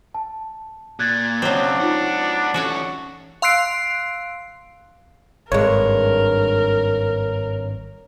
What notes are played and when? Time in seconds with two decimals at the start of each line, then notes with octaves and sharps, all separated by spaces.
0.15 A5
0.99 A#2 F#6 G#6 A6
1.42 B1 C#3 F#3 C4 D4
1.80 D#4 F4 C5 F#5
2.54 E3 C#4 F#4 A4 C#5
3.42 F5 C6 E6 F#6 C7 D7
5.52 G#1 G2 G#3 A#4 C#5